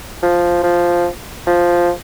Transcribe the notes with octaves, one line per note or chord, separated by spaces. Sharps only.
F3
F3
F3